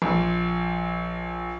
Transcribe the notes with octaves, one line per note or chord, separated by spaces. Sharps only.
A#1